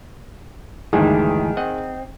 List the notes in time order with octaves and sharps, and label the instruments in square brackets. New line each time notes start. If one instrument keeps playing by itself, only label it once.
[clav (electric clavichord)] D2 G2 G#3 [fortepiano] D#3 [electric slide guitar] E3 D4 E4 [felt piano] G#4
[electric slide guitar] C4 [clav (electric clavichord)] D#5 F#5